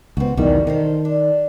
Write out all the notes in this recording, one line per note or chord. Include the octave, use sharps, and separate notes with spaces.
C#2 B3 C4 F#4
B1 E2 D#3 G3 F#4
D#3 A4 A#4 C5
D4